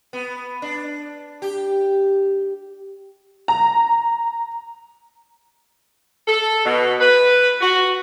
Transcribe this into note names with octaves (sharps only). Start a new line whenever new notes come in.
B3
D4
G4
A#5
A4
B2
B4
F#4